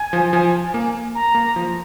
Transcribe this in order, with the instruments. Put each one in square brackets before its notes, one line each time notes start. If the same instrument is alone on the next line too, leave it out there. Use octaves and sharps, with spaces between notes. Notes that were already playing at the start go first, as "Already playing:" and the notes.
Already playing: [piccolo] G#5
[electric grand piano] F3
F3
A#3
[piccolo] A#5
[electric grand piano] A#3
F3